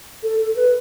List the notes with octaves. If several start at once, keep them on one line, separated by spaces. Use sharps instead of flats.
A4
A4
B4